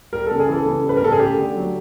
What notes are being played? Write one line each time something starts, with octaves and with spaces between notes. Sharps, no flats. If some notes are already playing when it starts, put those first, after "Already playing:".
G3 A#4
C#3 A4
G#4
E3 A4
C#3
G3
B4
A#4
C#3 A4
G#4
A3 G4
D3
F#3